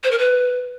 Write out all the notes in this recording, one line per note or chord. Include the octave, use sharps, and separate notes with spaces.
C5
A#4
B4